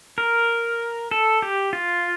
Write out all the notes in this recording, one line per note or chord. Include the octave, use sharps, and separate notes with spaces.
A#4
A4
G4
F4